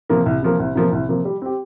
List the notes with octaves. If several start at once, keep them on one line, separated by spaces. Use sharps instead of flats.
C3 F3 A#3
C2
C3 F3 A#3
C2
C3 F3 A#3
C2
C3 F3 A#3
G3
C4 G4